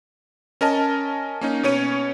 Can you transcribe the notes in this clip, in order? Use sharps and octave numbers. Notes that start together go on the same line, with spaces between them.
C#4 A#4 D#5 A5
A#3 C#4 D#4
B2 C#4 C#5 D#7